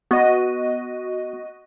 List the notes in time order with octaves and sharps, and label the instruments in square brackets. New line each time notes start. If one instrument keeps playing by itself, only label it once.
[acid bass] B3 [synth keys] F#4 D#5